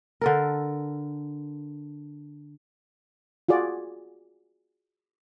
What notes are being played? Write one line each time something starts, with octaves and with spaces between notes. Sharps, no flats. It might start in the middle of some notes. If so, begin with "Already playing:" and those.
D3 A4 A#4
F4 F#4 G#4 D5